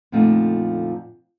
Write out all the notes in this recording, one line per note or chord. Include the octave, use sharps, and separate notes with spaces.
F2 A#2 D3 F3 A3 D#4